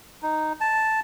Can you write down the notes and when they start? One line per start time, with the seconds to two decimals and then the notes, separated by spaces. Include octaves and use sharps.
0.23 D#4
0.61 A5